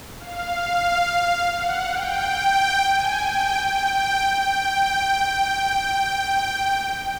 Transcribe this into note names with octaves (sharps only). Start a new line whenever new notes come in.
F5
F#5
G5
G#5
G5
G5
G5
G5